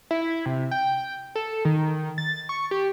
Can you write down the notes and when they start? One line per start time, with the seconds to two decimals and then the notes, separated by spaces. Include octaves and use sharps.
0.11 E4
0.46 C3
0.71 G5
1.35 A4
1.65 D#3
2.18 A6
2.49 C#6
2.71 G4